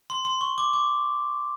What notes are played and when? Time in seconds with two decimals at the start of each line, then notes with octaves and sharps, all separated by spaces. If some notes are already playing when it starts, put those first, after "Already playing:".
0.10 C6
0.25 C6
0.41 C#6
0.58 D6
0.73 D6